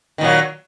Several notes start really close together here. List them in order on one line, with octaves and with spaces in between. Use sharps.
D#3 A#2 F#3